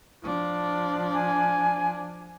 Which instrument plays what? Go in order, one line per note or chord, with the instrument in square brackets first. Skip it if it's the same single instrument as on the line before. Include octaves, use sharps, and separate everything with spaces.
[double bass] F3 D4
[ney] G#5